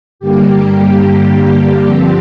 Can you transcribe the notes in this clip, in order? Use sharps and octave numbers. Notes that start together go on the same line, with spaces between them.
G2 D3 G3 A#3 G4
G2 D3 F3 C4